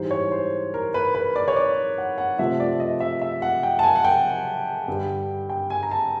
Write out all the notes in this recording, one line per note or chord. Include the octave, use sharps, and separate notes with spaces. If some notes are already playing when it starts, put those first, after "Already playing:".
Already playing: G#2 E3 G3 C5
C#5
C5
A#4
B4
B4
D5
C#5
D5
F#5
F#5
C3 F3 A3 E5
D5
D#5
E5
E5
F#5
G5
A5
G#5
F#5
G5
G2 D3 G3
G5
G#5
A#5
A5